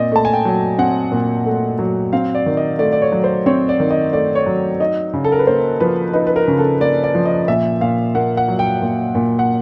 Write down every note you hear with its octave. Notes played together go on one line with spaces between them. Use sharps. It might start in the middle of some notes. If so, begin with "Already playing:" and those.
Already playing: A#2 C4 D5 D#5
A3 A5
G#5
G5
F#3
C4 F#5
A#2
A3
F#3
C4 F5
D5
D#3
D#5
A3 D5
D5
C#5
F#3
C5
C4 C#5
D5
D#3
D#5
A3 D5
C#5
F#3
D#4 D#5
C#3
A4
A#4
B4
A#3 C5
F3 B4
D#4 B4
B4
A#4
C#3
A4
A#3 D5
D5
F3
D#5
A#2 E5
A#2 F5
A#3 F#5
F#5
F#3
G5
A#2
A#2
F#5